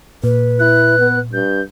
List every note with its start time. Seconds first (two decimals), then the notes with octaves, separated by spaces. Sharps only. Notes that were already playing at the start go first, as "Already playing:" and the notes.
0.24 A#2 B4
0.59 E4 F#6
0.99 B3
1.33 G2 G6